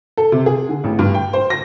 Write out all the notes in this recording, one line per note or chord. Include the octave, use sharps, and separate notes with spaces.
A4
C3
G#4
D3
A1
G2
G5
C5
A#6